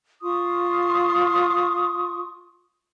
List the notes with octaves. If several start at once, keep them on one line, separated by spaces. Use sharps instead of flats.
F4 C6 C#6 D#6